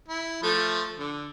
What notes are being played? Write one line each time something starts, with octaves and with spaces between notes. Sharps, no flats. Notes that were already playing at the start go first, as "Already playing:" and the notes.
E4
F3 A3
D3